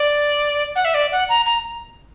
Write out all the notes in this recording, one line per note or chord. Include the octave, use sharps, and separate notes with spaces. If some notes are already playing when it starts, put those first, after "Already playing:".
Already playing: D5
F#5
E5
D5
F#5
A#5
A#5